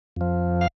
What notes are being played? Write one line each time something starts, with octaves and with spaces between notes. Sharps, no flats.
F2 F3
F5